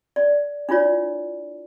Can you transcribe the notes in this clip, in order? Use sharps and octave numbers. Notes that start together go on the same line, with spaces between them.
D5
D4 E4 F4 C#5 D5